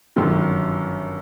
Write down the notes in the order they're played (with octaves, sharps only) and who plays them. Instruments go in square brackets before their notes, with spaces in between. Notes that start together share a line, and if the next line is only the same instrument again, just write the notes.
[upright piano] G1 F#2 D#3 F#3